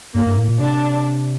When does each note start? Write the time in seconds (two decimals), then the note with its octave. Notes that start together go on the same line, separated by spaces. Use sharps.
0.15 G2 A#3
0.26 G2
0.37 A2
0.48 A#2
0.60 C3 D4